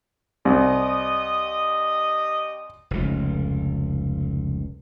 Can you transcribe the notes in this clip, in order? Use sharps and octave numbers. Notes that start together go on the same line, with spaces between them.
C2 G4 D#5 D#6
F1 C#2